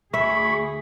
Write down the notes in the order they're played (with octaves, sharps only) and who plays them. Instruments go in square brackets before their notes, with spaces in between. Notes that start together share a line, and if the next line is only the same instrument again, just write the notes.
[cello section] D2 G#4 [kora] E5 [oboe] B5 [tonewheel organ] C#6